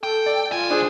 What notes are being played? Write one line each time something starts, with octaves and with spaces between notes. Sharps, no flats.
A4 G5
D5
C2 F4 G#5
D4 G#4 C5